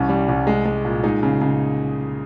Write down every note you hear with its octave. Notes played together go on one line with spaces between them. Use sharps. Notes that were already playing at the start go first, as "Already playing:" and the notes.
Already playing: C2 C#4
G3
C2
G#3
G#3
A#2
G#3 D#4
C#3
C#3